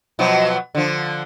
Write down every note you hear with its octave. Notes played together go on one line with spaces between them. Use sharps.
B2 F3 F#3
D3 F3